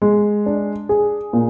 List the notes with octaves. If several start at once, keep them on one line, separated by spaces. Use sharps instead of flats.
G#3
D4
G#4
A#2